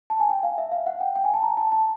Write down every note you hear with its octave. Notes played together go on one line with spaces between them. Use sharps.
A5
G#5
G5
F5
E5
F5
F#5
G5
G5
G#5
A5
A#5
A5
A5